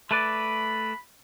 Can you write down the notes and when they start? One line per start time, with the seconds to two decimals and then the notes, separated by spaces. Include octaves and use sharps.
0.11 A3 B4 D5 B5